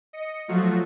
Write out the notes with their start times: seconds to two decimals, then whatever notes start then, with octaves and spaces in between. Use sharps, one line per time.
0.13 D#5 C#7
0.48 F3 F#3 A3 F4 F#4